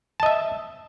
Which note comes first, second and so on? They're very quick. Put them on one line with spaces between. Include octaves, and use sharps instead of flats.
A5 D#5 E5